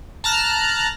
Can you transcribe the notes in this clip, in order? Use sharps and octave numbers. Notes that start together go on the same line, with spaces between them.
A5 A#5 F6 F#6